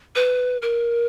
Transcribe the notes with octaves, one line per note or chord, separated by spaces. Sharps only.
B4
A#4